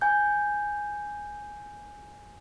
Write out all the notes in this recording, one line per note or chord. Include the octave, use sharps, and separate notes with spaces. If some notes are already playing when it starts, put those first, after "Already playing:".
G#5 G6